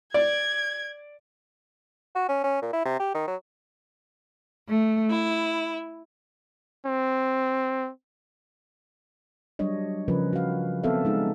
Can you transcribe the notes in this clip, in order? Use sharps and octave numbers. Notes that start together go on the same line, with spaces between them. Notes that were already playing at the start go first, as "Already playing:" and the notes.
D5 G#6
F#4
C#4
C#4
A#2
E4
C3
G4
D#3
F#3
A3
E4
C4
F#3 G3 D4 C#5 D#5
C#3 F3 C#4 A#4 B4
F#4 F5
B3 C4 A4 C#5 E5 F5
G#3 D#4 G#4